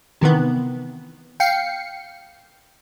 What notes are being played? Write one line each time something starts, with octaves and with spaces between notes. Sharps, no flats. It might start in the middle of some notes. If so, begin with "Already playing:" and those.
C3 D#3 E3 B3
F5 G5 C7 C#7